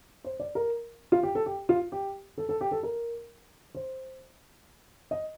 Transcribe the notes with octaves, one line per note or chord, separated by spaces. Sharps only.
C5
D5
A#4
F4
G4
A4
G4
F4
G4
A4
A4
G4
A4
A#4
C5
D#5